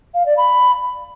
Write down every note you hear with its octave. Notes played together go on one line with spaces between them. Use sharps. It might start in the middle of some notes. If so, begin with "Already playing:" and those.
F5
D5
B5